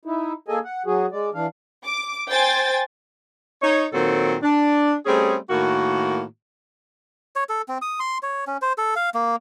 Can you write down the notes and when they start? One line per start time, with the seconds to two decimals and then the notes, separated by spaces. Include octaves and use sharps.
0.05 D#4 E4
0.48 A#3 G#4 A4 D#5 G#5
0.65 F#5
0.86 F#3 F#4 G#4
1.12 G#3 D5
1.34 E3 D4 F5
1.84 D6
2.30 C5 G5 G#5 A6
3.62 D#4 C#5
3.93 A#2 D#3 F#3 C4 A4 A#4
4.43 D4
5.06 G3 A3 C4 C#4 G#4
5.50 A2 D#3 A#3 F#4
7.36 C#5
7.49 A4
7.68 C4
7.82 D#6
8.00 C6
8.23 C#5
8.47 C#4
8.62 C5
8.78 A4
8.96 F5
9.14 A#3